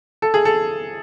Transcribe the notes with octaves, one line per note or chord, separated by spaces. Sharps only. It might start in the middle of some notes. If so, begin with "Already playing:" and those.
A4
G#4
A4